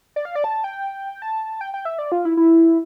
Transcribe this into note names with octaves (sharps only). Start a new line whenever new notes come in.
D5
F5
D5
A5
G5
A5
G5
G5
E5
D5
F4
E4
E4